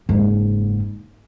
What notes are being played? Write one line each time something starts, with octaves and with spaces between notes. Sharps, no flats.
F#1 G#2